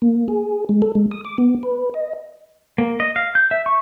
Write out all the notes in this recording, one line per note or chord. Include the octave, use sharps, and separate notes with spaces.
A#3
G#4
G#3
A4
G#3
D#6
D6
B3
B4
D#5
A#3
D#5
F5
G6
E5
C#6